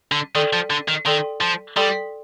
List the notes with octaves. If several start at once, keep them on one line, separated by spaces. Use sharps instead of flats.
D3
D#3 A4 D5 G5 C6 D#6
F3
D3
D#3
D#3 A4 D5 G5 C6 D#6
F3
G3 A4 D5 G5 C6 D#6